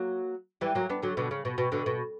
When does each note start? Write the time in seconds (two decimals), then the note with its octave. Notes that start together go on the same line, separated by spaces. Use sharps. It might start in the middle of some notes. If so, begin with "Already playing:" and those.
Already playing: F#3 A#3
0.61 E3 G3
0.75 F#3 A#3
0.90 B3 D4
1.03 D3 F#3
1.17 B2 D3
1.31 C#3
1.45 B2
1.58 B2
1.72 B2 D3
1.86 B2